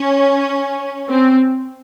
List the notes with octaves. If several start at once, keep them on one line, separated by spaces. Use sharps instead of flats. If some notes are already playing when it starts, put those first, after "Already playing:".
Already playing: C#4
C4